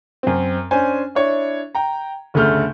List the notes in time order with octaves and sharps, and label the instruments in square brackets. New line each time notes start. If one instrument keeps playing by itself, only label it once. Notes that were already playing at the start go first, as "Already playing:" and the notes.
[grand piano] F#2 C4
C#4 D4 C5 G#5
D4 E4 C#5
G5 A#5
G1 D2 C#3 A3 F6 G6